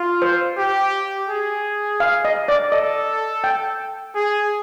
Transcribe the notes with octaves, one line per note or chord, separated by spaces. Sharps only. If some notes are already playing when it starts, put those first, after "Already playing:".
Already playing: F4
C5
G4
G#4
F5
D#5
D5
A4 D#5
G5
G#4